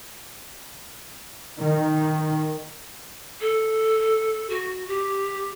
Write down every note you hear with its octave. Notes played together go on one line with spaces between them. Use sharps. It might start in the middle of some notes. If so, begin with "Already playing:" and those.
D#3
A4
F#4
G4